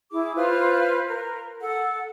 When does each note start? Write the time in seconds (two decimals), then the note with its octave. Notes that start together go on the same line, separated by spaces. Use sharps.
0.12 E4 G#4 D6
0.36 F4 B4 C5 F6
1.09 A#4
1.61 A4 F#5